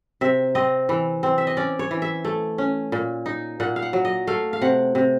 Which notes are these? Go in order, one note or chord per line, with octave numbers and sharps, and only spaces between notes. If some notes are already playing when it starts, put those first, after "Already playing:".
C3 E5
C4 D#5
E3
C4
E5
D#5
C#4 D5
C#5
E3
E5
A3
C#4
A#2
D#4
A#2 F#5
F5
F#5
F#3
D#5
A3 F5
F5
C3 F#5
C3